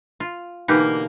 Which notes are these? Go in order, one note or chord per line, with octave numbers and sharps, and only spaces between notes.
F4
B2 D3 E3 A#3 D#4 G4